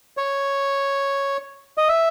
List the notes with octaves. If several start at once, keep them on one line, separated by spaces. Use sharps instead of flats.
C#5
D#5
E5